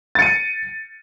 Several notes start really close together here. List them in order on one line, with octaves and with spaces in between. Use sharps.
A6 C#7 D#7